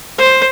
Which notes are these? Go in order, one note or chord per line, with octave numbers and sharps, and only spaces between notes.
C5